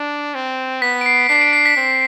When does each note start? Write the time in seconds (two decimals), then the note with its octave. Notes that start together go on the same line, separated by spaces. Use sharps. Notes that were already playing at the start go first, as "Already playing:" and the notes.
Already playing: D4
0.34 C4
0.81 B3 B6
1.01 D7
1.06 C7
1.29 D4 C7
1.41 D7
1.53 C7
1.66 B6
1.77 C4